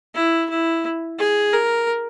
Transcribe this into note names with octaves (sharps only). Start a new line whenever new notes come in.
E4
E4
G#4
A#4